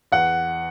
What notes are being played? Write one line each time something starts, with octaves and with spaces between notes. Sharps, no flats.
E2 F#5